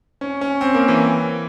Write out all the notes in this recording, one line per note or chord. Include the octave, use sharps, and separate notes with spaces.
C#4
C#4
C4
A#3
E3